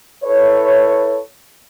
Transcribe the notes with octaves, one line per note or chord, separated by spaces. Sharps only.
E4 A4 B4 C#5